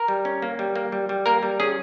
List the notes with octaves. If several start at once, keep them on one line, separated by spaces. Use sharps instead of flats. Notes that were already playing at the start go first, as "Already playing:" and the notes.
Already playing: A#4
G3
C#4
A#3
G3
A#3
G3
G3
A#3 A#4
G3
C#4 G#4